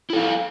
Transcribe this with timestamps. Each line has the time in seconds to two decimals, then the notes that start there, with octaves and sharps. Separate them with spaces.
0.10 E4
0.13 A4
0.16 F5